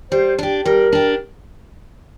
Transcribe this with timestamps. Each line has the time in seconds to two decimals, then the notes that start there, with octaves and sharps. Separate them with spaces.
0.11 G3 C5
0.39 D4 G4
0.65 G3 A#4
0.93 D4 G4